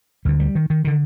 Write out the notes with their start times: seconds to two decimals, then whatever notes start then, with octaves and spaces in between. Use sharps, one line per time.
0.25 D2 D3 G3
0.40 G3
0.55 D#3
0.70 D#3
0.85 D3 D#3